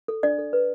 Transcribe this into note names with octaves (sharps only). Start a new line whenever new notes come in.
A4
D4 D5
A4
B4